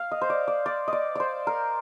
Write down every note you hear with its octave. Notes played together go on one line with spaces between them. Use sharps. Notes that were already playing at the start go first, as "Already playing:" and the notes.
Already playing: F5
D#5
C5
D5
D5
D5
D#5
D5
C5 D5
A#4